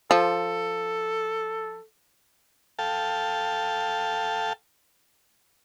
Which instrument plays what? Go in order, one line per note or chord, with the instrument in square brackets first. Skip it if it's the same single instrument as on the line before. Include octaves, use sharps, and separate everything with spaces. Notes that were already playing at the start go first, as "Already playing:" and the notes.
[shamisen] F3 [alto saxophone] A4
[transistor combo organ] A4 F5 G5 A5